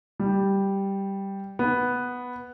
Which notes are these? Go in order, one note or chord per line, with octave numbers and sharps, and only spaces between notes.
G3
B3